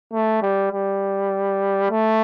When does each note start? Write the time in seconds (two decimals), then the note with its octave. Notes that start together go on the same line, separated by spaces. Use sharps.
0.14 A3
0.42 G3
0.73 G3
1.90 A3